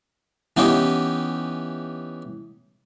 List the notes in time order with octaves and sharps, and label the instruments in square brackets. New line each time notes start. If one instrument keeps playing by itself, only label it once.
[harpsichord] E3 B3 C#4 D#4 G4